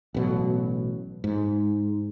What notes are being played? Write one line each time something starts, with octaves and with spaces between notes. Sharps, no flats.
A1 B2 F#3
G#2